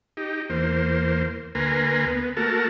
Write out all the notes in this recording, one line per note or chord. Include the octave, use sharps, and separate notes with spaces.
D#4 G4
E2 A#3 C5
D2 A#3 B4 G#5 A#5 C6
B3
A3 A#3 F#4 A#4 A5